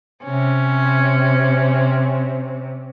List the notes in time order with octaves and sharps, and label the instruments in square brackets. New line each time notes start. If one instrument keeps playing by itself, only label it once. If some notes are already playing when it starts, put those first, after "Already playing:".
[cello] C3 [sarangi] C#4